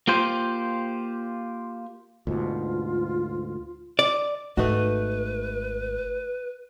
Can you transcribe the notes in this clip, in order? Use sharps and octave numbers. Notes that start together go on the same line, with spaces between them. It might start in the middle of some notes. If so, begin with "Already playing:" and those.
A#3 F4 G4 C5
D2 G#2 B2 F4
D5
G#1 A3 D#4 F#4 B4